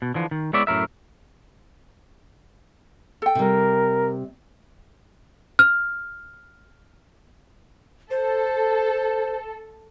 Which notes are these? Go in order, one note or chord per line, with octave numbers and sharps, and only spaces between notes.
B2
D3 E3 F3
D#3
G#3 B3 E4 C#5 D5 E5
F#2 A2 A#4 E5
A4 G5
C3 G3 A#4
F6
A4 C5